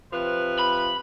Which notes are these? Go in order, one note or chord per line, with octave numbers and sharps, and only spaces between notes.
C3 F3 B4
B5